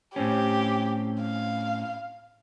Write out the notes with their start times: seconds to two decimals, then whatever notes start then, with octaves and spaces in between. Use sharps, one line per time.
0.16 A2 C4 C#4 G4
1.21 F5